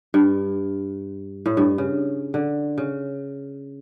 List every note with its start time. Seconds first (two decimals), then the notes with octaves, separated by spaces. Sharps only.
0.14 G2
1.46 A2
1.57 G2
1.78 C#3
2.34 D3
2.78 C#3